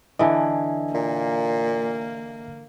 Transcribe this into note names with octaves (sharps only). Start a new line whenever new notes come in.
D3 E3 D#5 E5 G#5
A#2 A#3